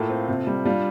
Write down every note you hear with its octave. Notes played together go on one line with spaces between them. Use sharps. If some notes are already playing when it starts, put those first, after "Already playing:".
Already playing: A2 A#3 F4 A4
C4
C3
G3
G3 D4 F4